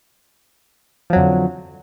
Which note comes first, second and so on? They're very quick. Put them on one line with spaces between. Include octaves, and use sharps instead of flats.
F3 F#3 F2 D3